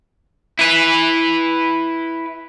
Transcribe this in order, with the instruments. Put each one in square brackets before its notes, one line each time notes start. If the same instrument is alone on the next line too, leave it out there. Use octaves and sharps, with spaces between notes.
[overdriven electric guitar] E4 B4